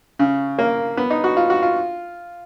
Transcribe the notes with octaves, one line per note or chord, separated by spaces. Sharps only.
C#3
A#3
B3
D#4
F#4
F4
F#4
F4